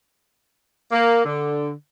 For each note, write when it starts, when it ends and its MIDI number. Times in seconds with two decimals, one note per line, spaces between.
0.92 1.25 58
1.25 1.72 50